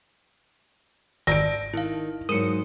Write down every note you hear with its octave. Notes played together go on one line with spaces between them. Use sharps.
G#1 D5 A5 E6 A#6 D7
D#3 E4 F5
G#2 F#3 A#4 D#6 C#7